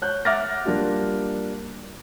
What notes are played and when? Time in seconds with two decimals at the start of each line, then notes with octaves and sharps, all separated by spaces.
0.02 C#5 F#6 G6
0.25 E5 F#5 D6 F6 A6 A#6
0.65 G3 A#3 D4 F4 G4